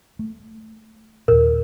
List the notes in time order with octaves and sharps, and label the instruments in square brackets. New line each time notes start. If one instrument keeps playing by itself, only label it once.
[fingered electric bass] A3
[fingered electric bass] D#2 A#2 [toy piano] A#4